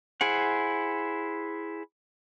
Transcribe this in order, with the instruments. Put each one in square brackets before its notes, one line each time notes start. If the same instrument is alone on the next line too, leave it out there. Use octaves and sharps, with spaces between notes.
[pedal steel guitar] E4 G#4 C5 F#5